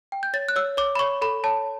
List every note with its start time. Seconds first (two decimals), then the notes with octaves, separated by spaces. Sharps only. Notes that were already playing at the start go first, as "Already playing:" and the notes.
0.12 G5
0.23 G6
0.34 C#5 A6
0.49 F#6
0.56 C#5 E6
0.77 C#5 D6
0.95 B5
0.99 C#5 C#6
1.22 A4 B5
1.44 C#5 A5